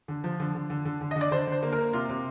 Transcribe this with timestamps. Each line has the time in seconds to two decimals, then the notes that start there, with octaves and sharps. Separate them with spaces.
0.08 D3
0.24 F3
0.40 D3
0.55 D3
0.70 D3
0.85 D3
1.01 D3
1.11 D3 D#5
1.21 D5
1.31 D3 C5
1.47 D3
1.52 C5
1.63 A#3
1.73 A#4
1.78 A#3
1.93 C3 F4
2.09 C3